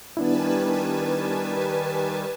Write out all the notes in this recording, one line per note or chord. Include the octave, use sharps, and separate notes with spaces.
D#3 G3 B3 D4 E4 B4 G#5 A5